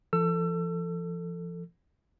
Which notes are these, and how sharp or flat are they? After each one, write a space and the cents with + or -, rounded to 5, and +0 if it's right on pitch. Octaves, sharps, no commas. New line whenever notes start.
F3 -45 A4 +15 E6 +30